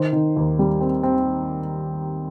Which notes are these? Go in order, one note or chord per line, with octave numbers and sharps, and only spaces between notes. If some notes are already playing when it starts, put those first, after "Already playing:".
Already playing: D#3 C5
D#3
D#2
G3
C4
C4